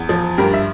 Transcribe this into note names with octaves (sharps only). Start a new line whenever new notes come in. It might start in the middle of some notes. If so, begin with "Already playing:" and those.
Already playing: E2
F3
G2 G4 A#4
E5